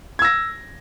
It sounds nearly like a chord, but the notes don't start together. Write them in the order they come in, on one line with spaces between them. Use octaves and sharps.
G#6 E6 A#6